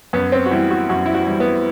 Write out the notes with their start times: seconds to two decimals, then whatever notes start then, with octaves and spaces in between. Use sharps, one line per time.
0.13 F#2 B3
0.32 C4
0.46 F#4
0.51 E3 G3 E4
0.71 F#4
0.89 F#2 F#4
1.06 E4
1.14 F#4
1.27 E3 G3
1.40 B3